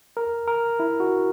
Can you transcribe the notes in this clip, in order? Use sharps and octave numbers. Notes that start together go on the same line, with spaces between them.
A#4
A#4
E4
F#4